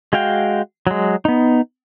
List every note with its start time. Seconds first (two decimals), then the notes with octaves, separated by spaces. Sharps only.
0.13 G#3 F#4 F5 G5
0.87 F#3 G#3
1.25 B3 D#4